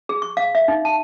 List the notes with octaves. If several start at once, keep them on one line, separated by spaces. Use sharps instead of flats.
G#4
C#6
F5
E5
D#4
A5